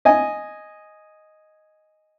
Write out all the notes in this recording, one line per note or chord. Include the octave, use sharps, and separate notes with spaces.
D#5 G#5